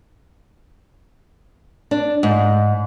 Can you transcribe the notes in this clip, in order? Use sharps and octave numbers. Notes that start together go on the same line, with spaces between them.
D4
G#2